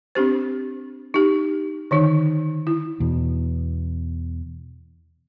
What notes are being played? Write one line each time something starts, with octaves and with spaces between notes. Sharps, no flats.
C4 D4 G4 C5
D#4 G4
D3 D#3 D#4
E4
E2 B2